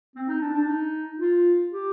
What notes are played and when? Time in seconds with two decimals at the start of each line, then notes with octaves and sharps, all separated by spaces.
0.15 C4
0.28 D#4
0.41 D4
0.54 D4
0.68 D#4
1.20 F4
1.72 G4